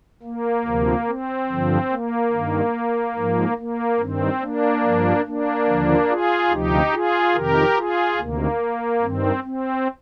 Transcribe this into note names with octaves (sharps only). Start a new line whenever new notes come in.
A#3
D2 C3 F3
C4
G2 D3 F3
A#3
G2 D#3
G#2 F3
A#3
G2 D#3 C4
A#3 D4
G2 F3
A#3 D4
D#2 D3 F3
F4 G#4
D2 C3 F3 D#4 G4
F4 G#4
F2 C3 D#3 G4 A#4
F4 G#4
D2 C3 D#3 A#3
G2 D#3 C4
C4